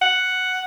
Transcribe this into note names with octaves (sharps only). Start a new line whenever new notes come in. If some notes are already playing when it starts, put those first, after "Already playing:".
F#5